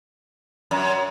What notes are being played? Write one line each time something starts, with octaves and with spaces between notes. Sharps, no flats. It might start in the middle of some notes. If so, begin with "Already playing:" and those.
F#2